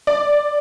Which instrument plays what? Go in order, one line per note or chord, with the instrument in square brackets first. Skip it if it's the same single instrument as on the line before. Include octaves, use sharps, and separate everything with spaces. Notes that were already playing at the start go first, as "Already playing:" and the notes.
[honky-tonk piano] D5